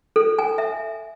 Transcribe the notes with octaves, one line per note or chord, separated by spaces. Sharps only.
A4
G#5
E5